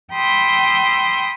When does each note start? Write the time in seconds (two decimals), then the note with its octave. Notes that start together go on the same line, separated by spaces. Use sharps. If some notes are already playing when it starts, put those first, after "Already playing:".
0.13 G5 B5 C6 D#6 E6